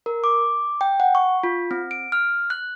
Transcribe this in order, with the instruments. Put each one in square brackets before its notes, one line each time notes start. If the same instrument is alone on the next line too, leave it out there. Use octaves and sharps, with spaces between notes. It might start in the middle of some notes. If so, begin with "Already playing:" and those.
[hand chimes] A#4
D6
G5
F#5
C#6
F4
C4
D7
F6
F#6